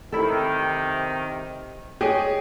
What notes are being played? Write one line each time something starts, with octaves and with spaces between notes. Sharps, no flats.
C3 D#3 E4 A4
G4 G#4 C#5 D#5